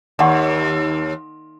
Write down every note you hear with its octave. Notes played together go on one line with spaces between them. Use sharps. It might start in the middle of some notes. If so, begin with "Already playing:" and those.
D#2 D5 F#5 C#6